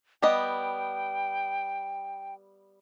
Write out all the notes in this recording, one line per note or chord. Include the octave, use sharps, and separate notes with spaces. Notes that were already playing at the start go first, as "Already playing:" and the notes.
G3 B3 D#5 G5